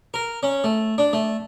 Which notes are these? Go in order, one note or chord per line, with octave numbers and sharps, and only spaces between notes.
A#4
C#4
A3
D4
A3